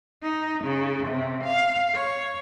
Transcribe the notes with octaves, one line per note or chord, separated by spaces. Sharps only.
D#4
C#3
C3
F5
C#5